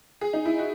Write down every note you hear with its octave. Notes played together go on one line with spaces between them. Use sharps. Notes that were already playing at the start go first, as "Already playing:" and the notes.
G#4
D#4
E4
F#4